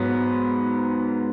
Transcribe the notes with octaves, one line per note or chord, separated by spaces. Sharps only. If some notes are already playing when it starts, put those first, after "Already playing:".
Already playing: G#2 F#3 B3